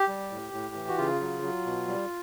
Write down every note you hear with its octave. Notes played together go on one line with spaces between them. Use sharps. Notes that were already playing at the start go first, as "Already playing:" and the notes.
Already playing: G4
G3
A2
A2
E3
F#4
C#3 F4
F#3
F#3
B2
G3